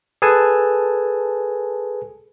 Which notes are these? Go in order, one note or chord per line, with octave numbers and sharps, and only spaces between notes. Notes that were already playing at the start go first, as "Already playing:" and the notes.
G#4 A4 B4 G#5 A5